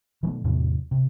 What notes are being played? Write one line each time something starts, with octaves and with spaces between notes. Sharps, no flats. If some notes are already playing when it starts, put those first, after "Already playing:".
B2 D#3 F#3 A3
E2 A2 C3 F#3
C3